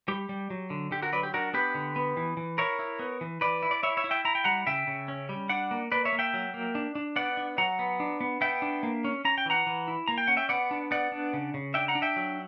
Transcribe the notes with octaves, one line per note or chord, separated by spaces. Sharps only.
G3 G4
G3
F#3
D3
D3 G4
F#4 A#4
F#3 B4 D5
G4
D4 F#4 A#4
B3 G4 B4
D3
B3
E3
E3
E4 A#4 C#5
E4
B3
E3
E3 B4 D5
E4
D5
E4 C#5 E5
C#5 E5
E4
E5 G5
E4 A#5
G5
G3 F#5 A#5
C#3 E5 G5
C#3
C#4
G3
D4 D5 F#5
A#3
A#3 B4 D5
C#5 E5
A#3
E5 G5
F#3
A#3
D4
D4
B3 D5 F#5
D4
F#3 F#5 A#5
B3
D4
B3
B3 E5 G5
D4
A#3
C#4
C#4 A#5
G5
E3 F#5 A#5
E3
E4
A#3 A#5
G5
C#4 F#5
E5 G5
B3 D5 F#5
D4
B3 D5 F#5
D4
C#3
C#3
D4 E5 G5
F#5 A#5
D4
E5 G5
F#3